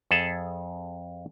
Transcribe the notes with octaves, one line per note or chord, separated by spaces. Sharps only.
F2 G#4 A4 E5 A5